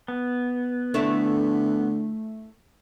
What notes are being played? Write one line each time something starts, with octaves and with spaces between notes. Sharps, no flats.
B3
D3 A3 D4 E4